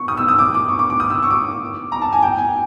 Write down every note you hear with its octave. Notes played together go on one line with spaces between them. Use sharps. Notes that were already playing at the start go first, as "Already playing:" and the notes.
Already playing: C#6
D#6
E6
D#6
D6
D6
C#6
D6
D6
D#6
E6
C#6
D6
A#5
A5
G#5
G5
G#5